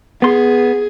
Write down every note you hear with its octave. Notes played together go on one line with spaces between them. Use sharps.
B3 G#4 C6